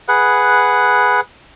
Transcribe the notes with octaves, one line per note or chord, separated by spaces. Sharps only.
G#4 B4 F#5